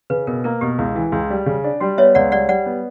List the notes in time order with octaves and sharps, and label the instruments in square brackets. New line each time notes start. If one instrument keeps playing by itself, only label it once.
[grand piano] C#3 [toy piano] B4
[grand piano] B2 [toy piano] A#4
[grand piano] A#3 [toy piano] A#4
[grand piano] B2 [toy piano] G4
[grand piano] C#2 [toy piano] E4
[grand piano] E3
C#2
G3
C#3
D4
[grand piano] G3 [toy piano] F#4
[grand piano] B3 [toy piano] C#5 E5
[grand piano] C#2 [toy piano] D5 F#5
[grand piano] G3 [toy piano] D5 F#5
[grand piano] G3 [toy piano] D5 F#5
[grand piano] B3